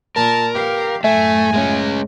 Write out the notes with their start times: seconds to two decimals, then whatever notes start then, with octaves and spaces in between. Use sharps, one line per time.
0.16 A#2 A#4 A5
0.55 G4 B4 F5
1.04 F#2 A2 A3 E5 G#5
1.54 G#3 A#3 C#4